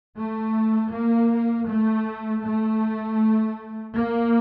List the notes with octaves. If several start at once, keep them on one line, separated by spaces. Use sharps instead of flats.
A3
A#3
A3
A3
A#3